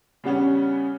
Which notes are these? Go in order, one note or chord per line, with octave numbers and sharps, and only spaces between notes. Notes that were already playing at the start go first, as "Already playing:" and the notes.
C#3 G3 B3 C#4